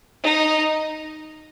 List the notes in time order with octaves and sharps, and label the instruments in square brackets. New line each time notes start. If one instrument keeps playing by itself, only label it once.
[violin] D#4